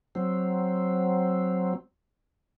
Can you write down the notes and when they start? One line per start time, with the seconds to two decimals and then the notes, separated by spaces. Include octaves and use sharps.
0.15 F#3 C4